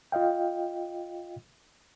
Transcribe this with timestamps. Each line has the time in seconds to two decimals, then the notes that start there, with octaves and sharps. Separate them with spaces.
0.12 F4 D#5 F5 G5